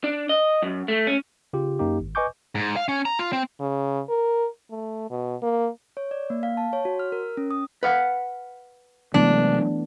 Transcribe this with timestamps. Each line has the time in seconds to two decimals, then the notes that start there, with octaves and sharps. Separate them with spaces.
0.04 D4
0.29 D#5
0.62 F#2
0.88 A3
1.07 C#4
1.53 C#3 F4 G4
1.79 F#2 A#3 D#4 G4
2.00 G#1
2.15 B4 D#5 G#5 C#6 D6 G6
2.55 G#2
2.76 F5
2.88 C#4
3.05 A#5
3.19 F4
3.33 C4
3.60 C#3
4.09 A#4
4.71 A3
5.10 B2
5.42 A#3
5.97 C#5
6.11 D5
6.30 A#3
6.43 F5
6.57 A5
6.73 C#5
6.85 F#4
6.99 F6
7.12 A#4
7.37 C#4
7.51 D#6
7.83 B4 F5 F#5
9.14 C3 E3 F#3 G#3 A3 B3 D4